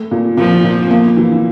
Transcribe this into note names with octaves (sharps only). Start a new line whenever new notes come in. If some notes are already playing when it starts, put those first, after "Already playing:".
Already playing: A3
A#2
A#2 F3
A#2
A#3
E3